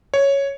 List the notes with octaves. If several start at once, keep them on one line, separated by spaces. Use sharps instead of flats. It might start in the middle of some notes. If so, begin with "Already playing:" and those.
C#5